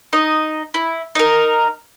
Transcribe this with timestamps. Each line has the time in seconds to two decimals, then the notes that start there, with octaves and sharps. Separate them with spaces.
0.13 D#4 D#5
0.74 E4
1.15 D#4 A#4